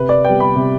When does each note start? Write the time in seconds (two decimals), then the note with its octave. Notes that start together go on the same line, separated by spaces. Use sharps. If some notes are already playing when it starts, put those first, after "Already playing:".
Already playing: C3 B4
0.09 D5
0.25 G3 B3 G5
0.40 B5
0.56 C3